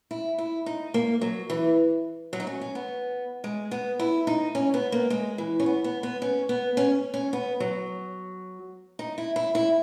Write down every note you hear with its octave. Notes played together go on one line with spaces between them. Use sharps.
E4
E4
D#4
A#3
F#3
E3
F#3
D#4
C#4
C#4
B3
G#3
B3
E4
D#4
C#4
B3
A#3
G#3
E3
C#4
B3
B3
B3
C#4
B3
C#4
C#4
B3
F#3
D#4
E4
E4
E4